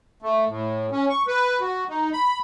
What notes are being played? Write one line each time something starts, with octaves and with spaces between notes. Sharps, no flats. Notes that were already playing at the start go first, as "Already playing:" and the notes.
A3
A2
C#4
C#6
B4
F#4
D#4
B5